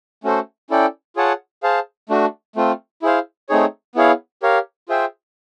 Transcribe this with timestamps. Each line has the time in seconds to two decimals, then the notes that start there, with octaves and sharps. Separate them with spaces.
0.24 A3 C#4 F#4 A4 C5
0.70 C#4 E4 A4 D5 G5
1.16 F4 G#4 C#5 F#5 A5
1.63 G#4 C5 F5 A5
2.09 A3 D4 F#4
2.56 A3 C4 F4
3.02 E4 G#4 C5 F5
3.49 A3 C4 D#4 G#4 C#5
3.95 B3 E4 G#4 C#5 F5
4.42 G4 A#4 C#5 F5
4.89 F4 G#4 C5 E5 G5